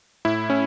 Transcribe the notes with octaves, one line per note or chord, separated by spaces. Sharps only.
A2 E4
A2 C#4